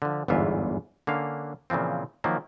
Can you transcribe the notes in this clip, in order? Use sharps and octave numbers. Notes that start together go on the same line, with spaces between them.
D3 F3
G1 E2 G#2 E3 F4 E5
D3 A#3 C#4 F5
A#2 C#3 E3 F3 C4
D#3 F3 F#3 A#3